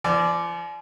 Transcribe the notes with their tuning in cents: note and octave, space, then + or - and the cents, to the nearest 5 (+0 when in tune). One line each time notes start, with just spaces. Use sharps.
F3 -40 D5 +0